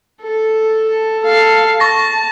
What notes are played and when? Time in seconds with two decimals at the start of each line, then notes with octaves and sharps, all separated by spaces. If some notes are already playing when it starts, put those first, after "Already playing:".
0.22 A4
1.24 A4 F5
1.80 A5 C#6 A#6